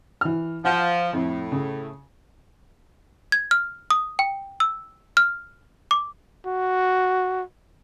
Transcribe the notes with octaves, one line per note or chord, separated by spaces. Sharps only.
E3 F6
F3 F#5
F2 A2
C#3
G#6
F6
D#6
G5
E6
F6
D6
F#4